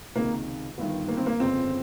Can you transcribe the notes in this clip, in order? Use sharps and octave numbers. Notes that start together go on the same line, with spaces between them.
C#2 C3 D#3 A#3
G1 G2 D#3
A#3
C4
A#3
G1 F2 C#3 C4